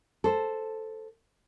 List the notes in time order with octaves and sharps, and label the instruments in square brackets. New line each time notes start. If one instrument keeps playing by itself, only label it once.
[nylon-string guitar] A4 C5